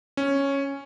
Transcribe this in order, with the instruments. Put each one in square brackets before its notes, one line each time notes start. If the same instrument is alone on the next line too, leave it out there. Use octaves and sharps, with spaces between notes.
[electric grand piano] C#4